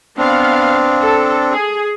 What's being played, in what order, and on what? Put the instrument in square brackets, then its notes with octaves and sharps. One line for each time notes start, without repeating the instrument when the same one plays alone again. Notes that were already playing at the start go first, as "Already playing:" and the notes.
[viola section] B3 F5 [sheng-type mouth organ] C4 D4
[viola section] A4
G#4